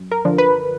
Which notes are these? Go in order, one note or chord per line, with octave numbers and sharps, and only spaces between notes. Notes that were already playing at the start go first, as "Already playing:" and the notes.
Already playing: F#2
A#4
D3 F3
B4